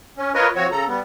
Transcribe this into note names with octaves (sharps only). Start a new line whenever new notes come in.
C#4
F4 A#4 B4 C#5 D#5
F3 C4 F#4 C#5
C#3 A4 A#5
G3 B3